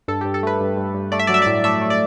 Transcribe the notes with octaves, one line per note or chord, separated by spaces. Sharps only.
G2 A4
G2 G4
A4
A3 B4
G2
G2
G2
A3 D5
E5
F#3 D5
E5
A2 D5
A3 E5
A3
D5